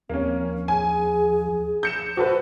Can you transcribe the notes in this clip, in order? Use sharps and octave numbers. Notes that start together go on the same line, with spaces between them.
D#2 F3 A#3 C4 C#4
G#4 G#5
G6 C#7 E7
F#4 A4 B4 C5